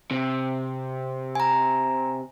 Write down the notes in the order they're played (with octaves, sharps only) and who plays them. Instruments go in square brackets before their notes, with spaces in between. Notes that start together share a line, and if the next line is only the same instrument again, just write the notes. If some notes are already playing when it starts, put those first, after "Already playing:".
[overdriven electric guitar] C3
[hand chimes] G#5 A#5